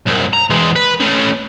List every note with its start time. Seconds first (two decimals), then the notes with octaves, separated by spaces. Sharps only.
0.06 C2 F#2
0.33 A#5
0.50 E3 G#3
0.76 B4
1.01 A3 C#4